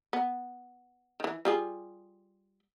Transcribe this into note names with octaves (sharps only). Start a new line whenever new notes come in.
B3
D#3 E3
G3 F4 G#4